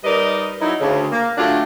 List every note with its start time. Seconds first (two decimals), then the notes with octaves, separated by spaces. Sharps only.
0.04 G3 D#4 A#4 B4 D5 D#5
0.60 F#3 D#4 E4
0.81 D2 C#3
1.12 A#3
1.38 D3 F#3 A3 D4 F4 G4